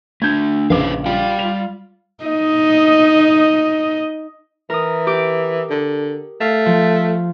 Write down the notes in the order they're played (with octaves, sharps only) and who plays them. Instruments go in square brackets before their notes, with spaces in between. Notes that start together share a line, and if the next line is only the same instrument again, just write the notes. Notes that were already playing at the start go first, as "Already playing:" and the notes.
[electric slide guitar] A3 D4 [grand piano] G6 G#6
[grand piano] A#1 C#3 D6 [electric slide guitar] B4 C5 F5
[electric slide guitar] G3 D5 G5 [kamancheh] F4
[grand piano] F7
[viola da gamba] D#4 D#5
[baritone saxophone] E3 [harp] A#4 D#6
[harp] G4 D6
[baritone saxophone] D3
[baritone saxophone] A3 [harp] F5
[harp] F3